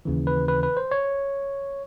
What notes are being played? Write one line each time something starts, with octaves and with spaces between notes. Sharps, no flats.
D#2 C#3 E3
B4
B4
B4
C5
C#5